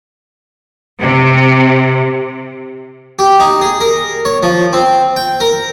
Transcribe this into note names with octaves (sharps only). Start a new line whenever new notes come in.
C3
G4
D#4
G#4
A#4
C#5
F3
C4
G5
A#4